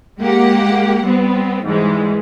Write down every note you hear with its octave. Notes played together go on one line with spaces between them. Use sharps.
G#3 A#3 G4 F#5
G3 B3 C4
G#2 E3 G3 G#3